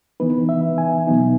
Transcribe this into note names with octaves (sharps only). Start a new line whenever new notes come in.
E3 B3 D#4 B4
E5
G#5
B2 F#3 B3 D#4